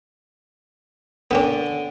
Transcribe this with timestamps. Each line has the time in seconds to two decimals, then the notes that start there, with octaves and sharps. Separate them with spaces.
1.31 D3 B3 C#4 A#4 G5 D6